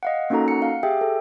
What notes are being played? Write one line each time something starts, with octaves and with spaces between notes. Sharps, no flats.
D#5 F5 F#5
A#3 C#4 D#4 F#4 A4 A#5
F#5 C#7
F5
G4 G#4 E5 G5
A4